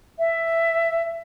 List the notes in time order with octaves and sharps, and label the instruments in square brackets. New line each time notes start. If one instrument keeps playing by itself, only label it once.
[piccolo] E5